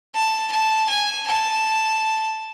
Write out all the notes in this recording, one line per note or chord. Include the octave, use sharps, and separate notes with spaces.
A5
A5
G#5
A5